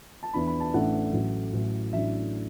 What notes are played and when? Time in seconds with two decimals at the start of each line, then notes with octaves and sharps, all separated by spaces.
0.23 A5
0.34 E2 E3 D4 B5
0.47 B5
0.60 A5
0.73 A1 A2 A3 D4 F#5
1.13 A1 A2 F#3
1.53 A1 A2 F#3
1.92 A1 A2 F#3 D4 E5